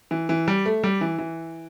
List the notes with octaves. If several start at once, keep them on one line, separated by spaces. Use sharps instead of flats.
E3
E3
G3
A3
G3
E3
E3